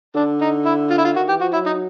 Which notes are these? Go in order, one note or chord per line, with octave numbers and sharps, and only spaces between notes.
D3 D4
D#4
E4
F4
E4
F4
D#3 F#4
E3 G4
F3 F#4
F#3 E4
D#4